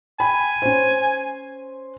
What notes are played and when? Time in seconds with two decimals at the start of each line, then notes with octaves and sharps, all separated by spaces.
0.20 G5 G#5 B5
0.62 C#4 C5